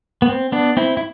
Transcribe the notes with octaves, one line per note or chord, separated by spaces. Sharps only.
B3
C4
B3 D4
C4 E4
E4